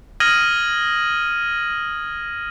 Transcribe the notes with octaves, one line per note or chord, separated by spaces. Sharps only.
D#6 F6 G#6 A#6 D#7 F#7